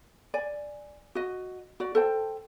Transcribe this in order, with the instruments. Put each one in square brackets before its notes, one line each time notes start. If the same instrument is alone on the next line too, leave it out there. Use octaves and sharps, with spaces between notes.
[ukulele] D5 G#5
F#4 D#5
F#4 D5
A4 C5 G5